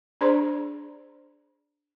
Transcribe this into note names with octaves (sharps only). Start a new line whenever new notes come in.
D4 G#4 C5 D5 A#5 C6